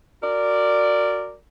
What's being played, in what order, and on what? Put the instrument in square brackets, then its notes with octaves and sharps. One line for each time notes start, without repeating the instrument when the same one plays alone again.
[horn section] F#4 A#4 D5